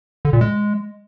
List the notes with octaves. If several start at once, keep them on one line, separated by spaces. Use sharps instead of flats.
D3
A#2
G#3